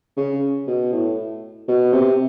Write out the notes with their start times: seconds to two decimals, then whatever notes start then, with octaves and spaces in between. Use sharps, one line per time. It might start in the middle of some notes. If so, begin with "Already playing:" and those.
0.17 C#3
0.67 B2
0.92 A2
1.68 B2
1.92 C3